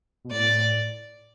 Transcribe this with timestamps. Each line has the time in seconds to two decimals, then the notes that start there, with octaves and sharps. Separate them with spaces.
0.25 B2
0.31 A2 D5